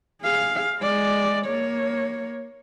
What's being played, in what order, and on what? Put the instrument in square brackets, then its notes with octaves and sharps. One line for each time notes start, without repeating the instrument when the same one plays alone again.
[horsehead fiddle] G#4 F5
G#3 D5
A#3 C#5